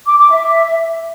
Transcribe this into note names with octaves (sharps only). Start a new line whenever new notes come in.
D6
D6
E5